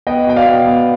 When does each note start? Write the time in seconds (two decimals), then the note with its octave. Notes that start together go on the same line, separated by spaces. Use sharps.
0.07 B3 D#5 G5
0.27 B2 G5
0.36 D5 F5
0.47 B3
0.67 B3